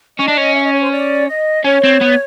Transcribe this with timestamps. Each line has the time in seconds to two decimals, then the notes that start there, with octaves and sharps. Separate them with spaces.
0.18 C#4 D#5
0.28 D4
0.37 C#4
0.55 E5
0.64 D#5
0.73 C#5
0.83 C5
0.92 D5
1.28 D#5
1.64 C#4 C#5
1.84 C4
2.01 B3